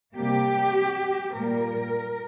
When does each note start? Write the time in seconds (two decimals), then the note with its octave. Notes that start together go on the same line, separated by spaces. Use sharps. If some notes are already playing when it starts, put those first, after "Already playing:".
0.15 C3 G3 A#3 G4
1.36 A#2 G3 A#3 A#4